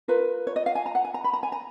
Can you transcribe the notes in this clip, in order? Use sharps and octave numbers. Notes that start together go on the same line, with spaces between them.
F4 A#4 B4
C#5
D#5
F5
G#5
A#5
F#5
G#5
A#5
B5
A#5
G#5
A#5